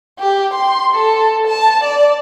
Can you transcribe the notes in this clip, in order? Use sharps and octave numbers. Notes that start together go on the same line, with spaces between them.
G4
C6
A4
A5
D5